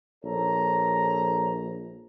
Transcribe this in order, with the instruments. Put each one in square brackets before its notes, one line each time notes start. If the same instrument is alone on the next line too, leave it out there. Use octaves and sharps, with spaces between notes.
[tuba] A#1 [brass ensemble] A4 C#5 A#5